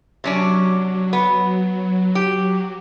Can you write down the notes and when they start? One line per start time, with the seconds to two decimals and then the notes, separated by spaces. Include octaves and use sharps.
0.24 C3 F#3 C#4 D4
1.13 B3
2.15 G4